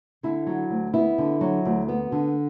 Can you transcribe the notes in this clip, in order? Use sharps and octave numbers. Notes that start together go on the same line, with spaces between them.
D3 E4
F#3
D2
B3 E4
D3
F#3
D2
B3
D3